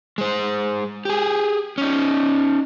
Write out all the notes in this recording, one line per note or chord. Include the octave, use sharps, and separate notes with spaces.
G#3 C5
G4 G#4
C#4 D#4